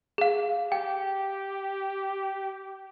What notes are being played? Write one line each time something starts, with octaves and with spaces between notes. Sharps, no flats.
G#4 F5
G4 G5